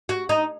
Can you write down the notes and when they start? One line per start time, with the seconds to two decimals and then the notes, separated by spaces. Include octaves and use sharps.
0.09 F#4
0.29 D#4